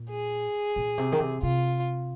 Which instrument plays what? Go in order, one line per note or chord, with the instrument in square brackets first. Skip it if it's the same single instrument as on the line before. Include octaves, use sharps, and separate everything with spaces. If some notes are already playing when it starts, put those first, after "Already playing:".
Already playing: [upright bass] A#2
[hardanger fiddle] G#4
[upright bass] A#2
C3
D#3
C3
[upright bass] C3 [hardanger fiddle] F4